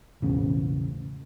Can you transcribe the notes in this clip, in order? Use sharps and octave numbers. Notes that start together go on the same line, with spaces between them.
E1 A1 C#3